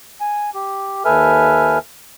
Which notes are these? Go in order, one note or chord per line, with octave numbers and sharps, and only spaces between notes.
G#5
G4
D#2 A4 B4 E5 G#5 F6